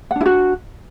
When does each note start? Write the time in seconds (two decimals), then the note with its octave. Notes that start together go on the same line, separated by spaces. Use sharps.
0.11 F#5
0.16 D4
0.21 E4
0.26 F#4